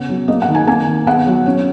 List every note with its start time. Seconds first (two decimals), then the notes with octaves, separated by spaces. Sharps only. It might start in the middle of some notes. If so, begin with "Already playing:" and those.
Already playing: C#3 B3
0.09 F#3
0.28 A#3 D#5
0.42 F#5
0.48 D#3
0.55 G#5
0.67 A#3 G#5
0.87 D#3
1.06 B3 F#5
1.26 F#3
1.46 C#4